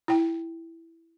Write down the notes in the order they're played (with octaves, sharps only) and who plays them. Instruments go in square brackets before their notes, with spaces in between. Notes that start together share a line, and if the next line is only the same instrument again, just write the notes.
[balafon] E4 G5